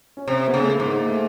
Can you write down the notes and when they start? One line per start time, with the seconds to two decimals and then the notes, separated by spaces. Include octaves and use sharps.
0.17 C#4
0.27 C3 C4
0.48 B3
0.54 C#3
0.62 A3
0.67 A#3
0.80 G#2
0.86 A#3
1.06 A3